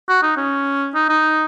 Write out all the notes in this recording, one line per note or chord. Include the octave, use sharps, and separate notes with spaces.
F#4
D#4
C#4
D#4
D#4